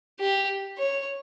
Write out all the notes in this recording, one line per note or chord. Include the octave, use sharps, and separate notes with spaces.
G4
C#5